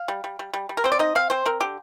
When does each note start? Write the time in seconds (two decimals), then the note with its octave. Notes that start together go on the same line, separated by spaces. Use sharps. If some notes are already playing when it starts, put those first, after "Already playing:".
Already playing: F5
0.08 G3
0.24 G3
0.39 G3
0.54 G3
0.69 G3
0.77 A#4
0.84 C4 C5
0.92 D5
0.99 D#4 D#5
1.15 C4 F5
1.30 C4 C5
1.46 C4 A#4
1.60 D3 G4